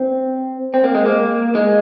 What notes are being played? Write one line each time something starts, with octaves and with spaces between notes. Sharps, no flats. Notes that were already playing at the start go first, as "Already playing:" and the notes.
Already playing: C4
C4
A#3
G#3
A#3
G#3